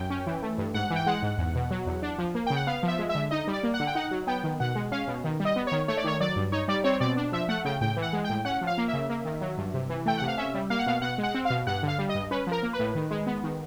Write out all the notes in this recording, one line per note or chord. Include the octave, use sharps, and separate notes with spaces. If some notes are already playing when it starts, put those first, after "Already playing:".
Already playing: F#2 G5
C#4
E3
A3
G2
G#2 F#5
E3
G5
G#3 F#5
G#2
E2
B2
F#3
E2
D4
F3
A#3
C#3 G5
F#5
B3 F5
F3
E5
G#3
E5
D3
D#4 D#5
G3
D5
A#3
F#5
D3
G5
D#4 F#5
F#3
B3 G5
D#3
B2 F#5
G#3
C#4 F5
B2
D#3
G3
D#5
B3
D#3 C#5
A3 C#5
D5
D#3 C#5
F#3 D5
G2
D#4 C#5
G3 D5
C4 C#5
B2 D5
D4
F3 E5
A3 F#5
C#3 G5
A2 G5
E3
F#5
G#3
G5
A2
C#4 F#5
F3
F5
A#3
E5
C#3
A#3
D#3
F#3
G2
C3
E3
A3 G5
C3 F#5
F5
C#4 E5
G3
A#3 F5
F#5
B2 F5
B2 F#5
G#3
F#5
C4
F5
B2
G2 F#5
D3
F5
G3
D#5
G2
C#4 B4
F3 A#4
A#3
B4
A2
D#3
G#3
B3
D#3